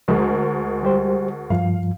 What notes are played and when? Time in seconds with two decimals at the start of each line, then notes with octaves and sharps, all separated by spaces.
0.08 D2 G#3 A#4
0.83 G3 G4 C5
1.50 G2 F3 F5